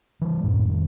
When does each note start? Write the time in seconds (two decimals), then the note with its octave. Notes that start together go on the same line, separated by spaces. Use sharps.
0.21 E3 G3
0.44 D#1 F#2 A2
0.65 F1 D#3